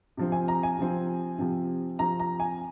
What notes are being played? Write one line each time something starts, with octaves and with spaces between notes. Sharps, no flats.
C3 F3 C4
G#5
A#5
G#5
C3 F3 C4
C3 F3 C4
C3 F3 C4 A#5
A#5
G#5